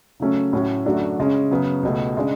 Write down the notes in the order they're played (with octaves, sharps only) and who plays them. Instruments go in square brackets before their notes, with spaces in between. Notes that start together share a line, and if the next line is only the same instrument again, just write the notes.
[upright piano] C#3 F#3 A3 C#4
A2 F#3 C#4 F#4
F#2 D3 A3 D4 F#4
C#3 G#3 C#4
F#2 C#3 F#3 B3
C#2 B2 A3
C#3 G#3 D4